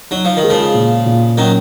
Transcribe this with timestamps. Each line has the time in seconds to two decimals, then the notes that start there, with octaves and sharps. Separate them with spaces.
0.11 F#3 D#4
0.25 F3
0.37 D#3
0.43 G#3
0.50 C#3 F3
0.74 A#2
1.06 A#2
1.38 D#3 F#3 C#4